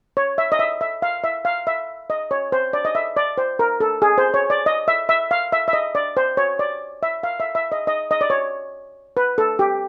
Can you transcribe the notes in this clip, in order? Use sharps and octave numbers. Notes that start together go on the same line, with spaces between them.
C#5
E5
D#5
E5
E5
F5
E5
F5
E5
D#5
C#5
C5
D5
D#5
E5
D5
C5
A#4
A4
G#4
C5
C#5
D5
D#5
E5
E5
F5
E5
E5
D#5
D5
C5
C#5
D5
E5
F5
E5
E5
D#5
D#5
D#5
D5
C#5
B4
A4
G4